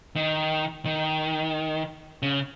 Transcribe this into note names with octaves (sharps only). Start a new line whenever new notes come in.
D#3
D#3
C#3